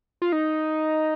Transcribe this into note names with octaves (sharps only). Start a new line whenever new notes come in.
F4
D#4